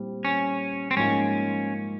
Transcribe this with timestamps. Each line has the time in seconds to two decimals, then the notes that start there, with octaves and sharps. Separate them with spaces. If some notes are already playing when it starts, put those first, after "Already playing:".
Already playing: A#2 G3 C4 E4
0.25 C#4
0.91 C4
0.96 G#2 F3 A#3 C#4 D#4